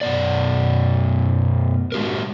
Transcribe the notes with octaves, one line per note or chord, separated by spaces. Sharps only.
F#2 B2 B3 D5
G#3 F#4 G4 A#4